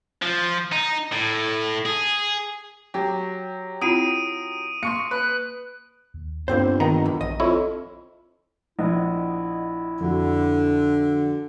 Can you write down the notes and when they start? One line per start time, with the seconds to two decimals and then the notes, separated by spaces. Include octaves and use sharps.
0.22 F3
0.72 D#4
1.12 A2
1.86 G#4
2.94 F#3 G4
3.82 C4 E4 F4 D#6 D7 D#7
4.83 A#3 C6 C#6 C#7
5.11 B4 F#6
6.14 D#2
6.48 G1 G2 A#3 C4 C5
6.80 D#3 B3 A#5
7.06 E2
7.21 A#1 D#5
7.40 F2 E4 C#5
8.79 A#1 E4 D#5 F#5 D#6
10.01 F2 D3 F#4